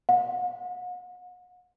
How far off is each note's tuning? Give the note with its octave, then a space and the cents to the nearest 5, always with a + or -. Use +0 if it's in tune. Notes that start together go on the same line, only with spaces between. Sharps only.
F#5 -40